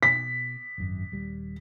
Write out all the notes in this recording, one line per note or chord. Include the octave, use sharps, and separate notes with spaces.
B2 B6
G#1 F#2
D#1 G3